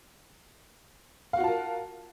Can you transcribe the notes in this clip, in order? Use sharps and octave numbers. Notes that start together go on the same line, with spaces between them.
F4 F#4 A#4 F5 A5